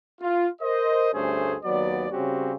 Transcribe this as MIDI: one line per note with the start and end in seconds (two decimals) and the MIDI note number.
0.21 0.46 65
0.62 1.09 70
0.62 1.09 72
0.62 1.09 75
1.13 1.56 38
1.13 1.56 43
1.13 1.56 57
1.13 1.56 61
1.13 1.56 68
1.13 1.56 72
1.64 2.07 39
1.64 2.07 54
1.64 2.07 59
1.64 2.07 74
2.11 2.52 49
2.11 2.52 55
2.11 2.52 60
2.11 2.52 61
2.11 2.52 66
2.11 2.52 67